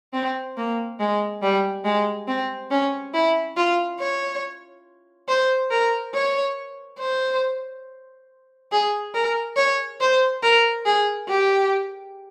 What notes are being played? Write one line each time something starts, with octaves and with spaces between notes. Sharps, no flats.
C4
A#3
G#3
G3
G#3
C4
C#4
E4
F4
C#5
C5
A#4
C#5
C5
G#4
A#4
C#5
C5
A#4
G#4
G4